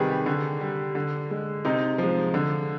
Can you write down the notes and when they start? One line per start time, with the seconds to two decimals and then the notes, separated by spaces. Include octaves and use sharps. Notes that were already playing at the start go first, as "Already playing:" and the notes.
Already playing: C3 D#3 G3 G#4 B4
0.10 G4
0.26 D3
0.61 G3
0.95 D3
1.31 G#3
1.65 C3 D#4
1.98 F3 G#3
2.34 D3